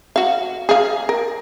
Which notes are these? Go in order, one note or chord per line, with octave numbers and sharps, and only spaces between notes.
F#4 F5
G#4 F5
A#4